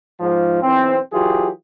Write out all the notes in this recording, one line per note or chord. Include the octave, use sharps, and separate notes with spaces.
G#2 F3
B1 E3 C4
E3 F#3 F4 G4 G#4